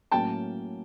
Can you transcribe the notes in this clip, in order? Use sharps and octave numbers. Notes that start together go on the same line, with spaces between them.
A2 F#3 A#3 C#4 G5 A5